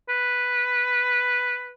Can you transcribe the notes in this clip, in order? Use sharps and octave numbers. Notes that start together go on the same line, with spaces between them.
B4